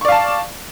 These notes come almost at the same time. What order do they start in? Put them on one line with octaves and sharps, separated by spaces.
C#6 D5 F5 A5